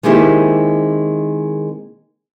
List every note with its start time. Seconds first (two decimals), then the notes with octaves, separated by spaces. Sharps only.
0.03 D#3 G#3 A#3 C4 E4 G4